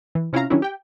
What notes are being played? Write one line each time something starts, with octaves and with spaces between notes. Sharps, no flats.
E3
C3 C#4 E4 F4 F5 A#5
D#3 F#3 C#4 D4 E4
G4 G5